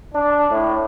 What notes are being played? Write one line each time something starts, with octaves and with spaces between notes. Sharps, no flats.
D4
A2